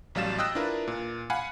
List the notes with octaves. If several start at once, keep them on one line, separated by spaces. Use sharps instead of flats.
A1 F#3 G3 F5 A6 E7
D#5 G5 D#6 E6 F#6 A#6
D4 E4 F4 A#4 B4
A#2
F5 F#5 G#5 B5 F#6